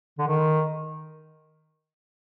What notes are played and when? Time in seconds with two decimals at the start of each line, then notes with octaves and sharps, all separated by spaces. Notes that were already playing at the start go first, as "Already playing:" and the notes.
0.19 D3
0.28 D#3